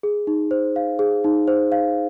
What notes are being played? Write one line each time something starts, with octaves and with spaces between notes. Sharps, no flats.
G#4
D#4
C5
F5
G#4
D#4
C5
F5